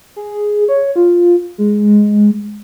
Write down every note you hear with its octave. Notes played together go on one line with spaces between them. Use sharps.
G#4
C#5
F4
G#3